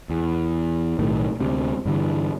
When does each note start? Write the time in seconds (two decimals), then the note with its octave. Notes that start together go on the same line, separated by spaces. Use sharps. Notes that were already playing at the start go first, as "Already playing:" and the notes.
0.10 E2
0.99 B1 A2 D#3
1.40 D2 C3
1.85 G2 D3 E3